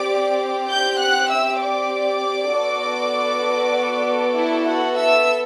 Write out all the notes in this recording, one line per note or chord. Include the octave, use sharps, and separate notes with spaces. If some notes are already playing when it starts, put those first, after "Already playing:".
Already playing: C4 G4 D5 D6
G5 G6
F#5 F#6
E5 E6
D5 D6
B3 F#4 A4
E4 E5
F#4 F#5
E5 E6